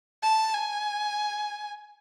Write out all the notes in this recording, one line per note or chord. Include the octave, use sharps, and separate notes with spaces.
A5
G#5